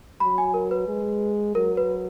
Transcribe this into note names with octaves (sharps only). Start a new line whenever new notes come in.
F#3 B5
G#5
A#4
B4
G#3
F#3 A#4
B4